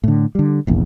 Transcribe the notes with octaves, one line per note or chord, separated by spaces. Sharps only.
A2 D3
D3 G3
F1 A#1 E2